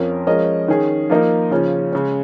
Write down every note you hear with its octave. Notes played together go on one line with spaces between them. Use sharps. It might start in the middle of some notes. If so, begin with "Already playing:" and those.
Already playing: F2 F3 C#4 A#4
F3 G#3 C#4 A#4 D#5
D#3 C#4 G#4
F3 A#3 D#4 A#4
C#3 F3 C#4 F4
C#3 G#3 C#4